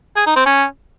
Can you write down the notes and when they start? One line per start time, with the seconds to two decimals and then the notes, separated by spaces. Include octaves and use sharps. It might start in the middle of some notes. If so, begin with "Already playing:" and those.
0.16 G#4
0.26 D#4
0.36 C4
0.46 C#4